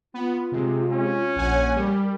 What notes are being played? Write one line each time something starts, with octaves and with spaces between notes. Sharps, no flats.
B3 F4
C3 G#3
C#4
A#1 C#5 F#5 G#5
G3 A#4